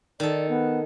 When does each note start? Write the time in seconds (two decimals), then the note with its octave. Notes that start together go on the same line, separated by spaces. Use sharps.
0.20 D#3 A4 D5
0.49 B3